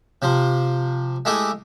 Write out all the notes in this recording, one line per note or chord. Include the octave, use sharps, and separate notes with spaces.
C3 F3 C5
G#3 A3 E4 G4 G#4 D#6